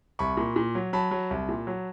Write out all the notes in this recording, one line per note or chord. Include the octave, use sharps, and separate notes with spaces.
C2 B5 C#6
A#2
A#2
F#3
F#3 A5 B5
F#3
C2
A#2
F#3